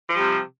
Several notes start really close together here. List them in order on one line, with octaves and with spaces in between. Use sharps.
F3 G3 C3